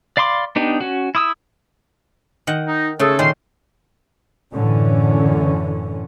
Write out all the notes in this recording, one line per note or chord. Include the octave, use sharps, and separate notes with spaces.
D5 F5 B5 C6 D6
B3 D4 D#4 G4
C#4 F#4
E4 D#6 E6
D#3 D#5 F#5
D#4
C#3 A3 G#4 A4 C6
A#2 D#3 C#4 C6
F#2 A2 D3 E3 C#4